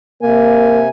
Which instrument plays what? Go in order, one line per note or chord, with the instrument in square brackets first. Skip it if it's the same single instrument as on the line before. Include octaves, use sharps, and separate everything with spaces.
[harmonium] C3 G#5 [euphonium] A#3